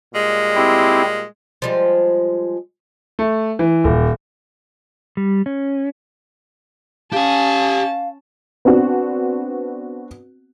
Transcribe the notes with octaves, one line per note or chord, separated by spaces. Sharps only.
A#2 G3 G#3
C4 E4 G4
F3 G3 G#3
A3
E3
D#1
G3
C#4
C#4 G4 F5 G#5 A5
B3 C4 D4 F#4